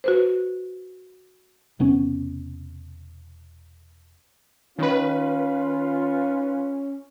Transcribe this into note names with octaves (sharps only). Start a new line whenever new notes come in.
F#4 B4 C5
E1 C3 B3 C#4
D#3 C#4 F4 B4